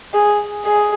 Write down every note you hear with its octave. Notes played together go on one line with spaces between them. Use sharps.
G#4
G#4